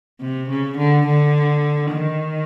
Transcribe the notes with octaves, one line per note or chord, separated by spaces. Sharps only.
C3
C#3
D3
D3
D#3